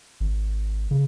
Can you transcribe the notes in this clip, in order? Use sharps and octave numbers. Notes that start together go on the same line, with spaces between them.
G#1
C#3